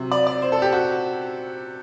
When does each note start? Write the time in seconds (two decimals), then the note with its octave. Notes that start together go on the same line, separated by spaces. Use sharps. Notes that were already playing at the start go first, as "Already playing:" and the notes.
Already playing: C3 F#3
0.11 D5
0.27 D5
0.42 C5
0.52 A4
0.62 G4
0.72 F#4